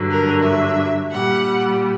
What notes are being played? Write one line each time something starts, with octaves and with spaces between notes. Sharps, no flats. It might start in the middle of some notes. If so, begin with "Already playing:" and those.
Already playing: G2 D3 F#3
A#4
E5
A#2 G3 F#5